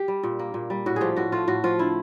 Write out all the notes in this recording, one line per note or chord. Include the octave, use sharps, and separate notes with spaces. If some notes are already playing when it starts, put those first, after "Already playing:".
Already playing: G4
G3
A#2
A#3
A#2
G3
A2 F#4
F3 G4 G#4
A2 F#4
A3 F4
A2 F#4
F3 F4
D3 E4